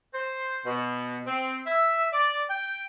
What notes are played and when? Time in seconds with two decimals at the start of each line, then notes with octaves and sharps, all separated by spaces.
0.14 C5
0.65 B2
1.26 C4
1.67 E5
2.13 D5
2.49 G5